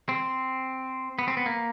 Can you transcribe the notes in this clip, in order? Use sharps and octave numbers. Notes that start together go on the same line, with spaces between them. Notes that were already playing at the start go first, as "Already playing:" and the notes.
C4
B3
C4
B3
A#3